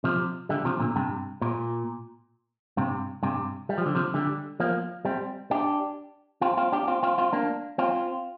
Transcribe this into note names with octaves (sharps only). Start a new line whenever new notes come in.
C3 F3
D3 G3
C3 F3
A#2 D3
G2 C3
A#2
G2 C3
G2 C3
G3
F3
D3
C3 F3
D3 G3
F3 A#3
G3 C4
D4 G4
C4 F4
C4 F4
D4 G4
C4 F4
C4 F4
C4 F4
A#3 D4
C4 F4